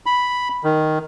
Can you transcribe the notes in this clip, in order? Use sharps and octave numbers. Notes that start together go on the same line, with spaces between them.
B5
D#3